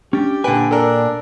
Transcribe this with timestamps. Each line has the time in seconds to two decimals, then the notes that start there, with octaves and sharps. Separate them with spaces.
0.13 C#4 D4 G4
0.44 A#2 D3 B4 G5 G#5
0.71 D4 A4 A#4